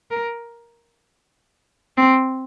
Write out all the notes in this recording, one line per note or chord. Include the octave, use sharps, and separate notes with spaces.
A#4
C4